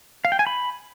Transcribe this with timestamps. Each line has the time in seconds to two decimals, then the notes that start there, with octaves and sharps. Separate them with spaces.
0.25 F5
0.32 G5
0.39 G#5
0.47 B5